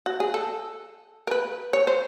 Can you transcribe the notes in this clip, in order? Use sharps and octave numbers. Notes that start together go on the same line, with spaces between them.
F#4
G#4
A4
A#4
B4
C#5
C5